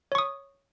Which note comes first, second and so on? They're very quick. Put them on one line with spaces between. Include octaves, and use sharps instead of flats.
C#5 C#6 D#6